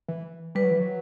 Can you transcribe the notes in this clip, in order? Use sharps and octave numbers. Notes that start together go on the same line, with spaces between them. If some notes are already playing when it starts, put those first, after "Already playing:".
E3
G3 B4
F#3
E3
F#3